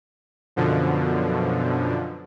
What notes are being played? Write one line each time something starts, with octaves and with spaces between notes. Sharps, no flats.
F#2 B2 D3 F3